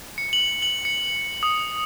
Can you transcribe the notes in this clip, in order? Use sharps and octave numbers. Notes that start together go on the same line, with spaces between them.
C#7
F#7
F#7
C#7
D#6